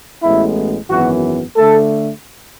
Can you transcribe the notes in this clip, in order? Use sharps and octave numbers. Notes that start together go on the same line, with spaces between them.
A1 A2 G#3 B3 E4
G#1 F#2 E3 B3 F#4
D3 A3 A4